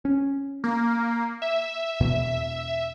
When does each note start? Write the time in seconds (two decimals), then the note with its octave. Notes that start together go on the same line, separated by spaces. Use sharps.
0.05 C#4
0.64 A#3
1.42 E5
2.00 E2 B2